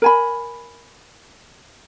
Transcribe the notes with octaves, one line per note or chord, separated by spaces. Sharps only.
A#4 G#5 B5